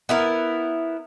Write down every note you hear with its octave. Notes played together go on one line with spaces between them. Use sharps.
B3 E4 A#4